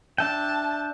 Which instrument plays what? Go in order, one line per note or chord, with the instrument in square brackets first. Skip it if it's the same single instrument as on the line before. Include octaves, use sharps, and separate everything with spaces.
[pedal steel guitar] D4 E5 G5 [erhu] A5